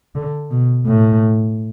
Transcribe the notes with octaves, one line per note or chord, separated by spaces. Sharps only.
D3
B2
A2